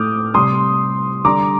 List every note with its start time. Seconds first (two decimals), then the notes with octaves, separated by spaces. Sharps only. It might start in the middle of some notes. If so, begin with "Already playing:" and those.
Already playing: A2 A3 D6 D#6 F6 G6
0.34 C3 G3 C6 D#6
1.25 D3 G3 A#5 D6